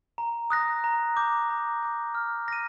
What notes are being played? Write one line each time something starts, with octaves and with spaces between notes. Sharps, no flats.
A#5
D#6 F#6 A#6
A#5
D6 G6
A#5
D6 G6
F6
A#6 D#7